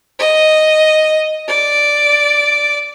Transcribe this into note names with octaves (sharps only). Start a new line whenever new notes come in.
D#5
D5